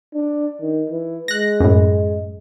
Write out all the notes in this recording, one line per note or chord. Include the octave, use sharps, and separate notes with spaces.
D4
D#3
E3
G#3 F#6 A#6
F#2 A2